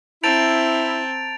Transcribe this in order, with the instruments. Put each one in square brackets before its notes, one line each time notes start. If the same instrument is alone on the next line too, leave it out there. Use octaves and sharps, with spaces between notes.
[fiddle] C4 [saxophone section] E4 [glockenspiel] A5 A#5 G6 [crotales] A6 D7 F7